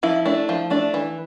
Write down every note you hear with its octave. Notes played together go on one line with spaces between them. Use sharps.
F3 E4
A3 D4
F3
A3 D4
E3